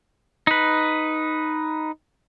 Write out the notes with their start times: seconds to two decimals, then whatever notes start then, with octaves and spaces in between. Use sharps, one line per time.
0.47 D#4 B4